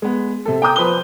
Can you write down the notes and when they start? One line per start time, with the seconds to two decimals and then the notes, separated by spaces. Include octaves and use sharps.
0.02 G#3 B3
0.45 C3 A4
0.62 G5 A#5 D6 D#6 G6
0.76 F3 B4 C5 D#6 G7